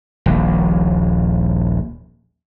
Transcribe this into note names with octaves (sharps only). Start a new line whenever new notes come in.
D#1 A#1